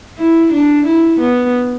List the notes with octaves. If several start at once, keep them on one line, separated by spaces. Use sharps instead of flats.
E4
D4
E4
B3